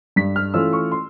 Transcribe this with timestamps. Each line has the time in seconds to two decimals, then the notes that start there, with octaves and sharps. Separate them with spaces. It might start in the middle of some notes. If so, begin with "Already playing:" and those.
0.16 G2 B6
0.36 F6
0.54 E3 A3 C#4 F4 E6
0.73 C#6
0.92 C6